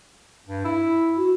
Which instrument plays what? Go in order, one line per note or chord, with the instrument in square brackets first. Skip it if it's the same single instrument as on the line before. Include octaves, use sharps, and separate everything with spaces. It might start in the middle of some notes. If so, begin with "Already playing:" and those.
[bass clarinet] G2
E4
[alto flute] F#4